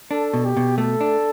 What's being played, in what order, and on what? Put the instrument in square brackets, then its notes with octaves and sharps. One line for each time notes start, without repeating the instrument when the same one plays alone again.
[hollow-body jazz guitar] D4 [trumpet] A4
[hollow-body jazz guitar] B2
[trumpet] G4
[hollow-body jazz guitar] B2
[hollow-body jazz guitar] A3 [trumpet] A4
[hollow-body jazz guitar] D4